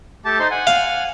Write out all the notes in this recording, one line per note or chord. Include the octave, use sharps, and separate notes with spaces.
A3 G4 A5
D#4 C5 C6
F#5 G#5
F5